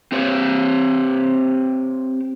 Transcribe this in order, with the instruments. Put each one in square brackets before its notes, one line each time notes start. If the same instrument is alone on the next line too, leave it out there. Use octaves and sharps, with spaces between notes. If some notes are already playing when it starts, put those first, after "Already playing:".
[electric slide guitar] C4 G4 C5 C#5